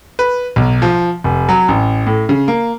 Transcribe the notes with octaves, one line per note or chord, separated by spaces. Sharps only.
B4
B1
F3
F1
F#3
A1
A2
C#3
A#3